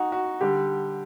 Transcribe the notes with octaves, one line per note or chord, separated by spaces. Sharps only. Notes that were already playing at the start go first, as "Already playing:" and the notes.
Already playing: D#4 F#4
F#4
D3 G3 G4